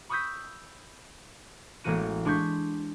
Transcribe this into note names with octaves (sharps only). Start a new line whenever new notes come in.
B5 C#6 D#6 E6 G6 B6
A1 G#3 A#3 F#4 D#7
G#3 D4 C6 C#6 G6 B6